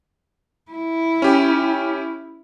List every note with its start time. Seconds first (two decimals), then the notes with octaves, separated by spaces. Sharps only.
0.71 E4
1.22 C#4 G4